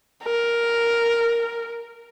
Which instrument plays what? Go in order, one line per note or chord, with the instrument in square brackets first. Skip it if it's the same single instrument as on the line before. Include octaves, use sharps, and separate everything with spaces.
[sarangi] A#4